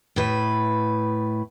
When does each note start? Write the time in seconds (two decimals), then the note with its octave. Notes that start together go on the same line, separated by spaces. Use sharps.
0.16 A2 B4